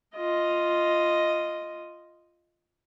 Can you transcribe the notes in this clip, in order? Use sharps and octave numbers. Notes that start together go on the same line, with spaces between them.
F4 D#5